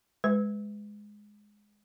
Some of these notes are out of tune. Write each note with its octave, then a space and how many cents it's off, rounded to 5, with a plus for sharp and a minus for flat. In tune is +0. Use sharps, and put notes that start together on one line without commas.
G#3 +0 B4 +20